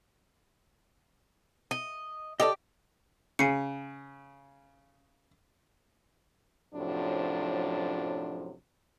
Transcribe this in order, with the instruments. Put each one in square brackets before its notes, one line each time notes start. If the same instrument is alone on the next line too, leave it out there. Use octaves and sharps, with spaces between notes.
[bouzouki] D#5
[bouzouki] G4 [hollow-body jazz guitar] A4 D5 D#5
[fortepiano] C#3 [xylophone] G#5 C7 C#7
[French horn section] F#2 A2 C3 F3 F#3 D4